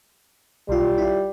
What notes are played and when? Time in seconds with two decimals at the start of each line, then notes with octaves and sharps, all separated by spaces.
0.69 B1 G3 F4
0.98 E4 F4